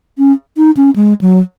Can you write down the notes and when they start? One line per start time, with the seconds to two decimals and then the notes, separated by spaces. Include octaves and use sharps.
0.19 C#4
0.57 D#4
0.77 C#4
0.96 G#3
1.21 F#3